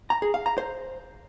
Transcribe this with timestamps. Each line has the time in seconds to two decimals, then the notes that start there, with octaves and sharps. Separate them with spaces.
0.10 A#5
0.22 G#4
0.34 F5
0.46 A#5
0.58 C5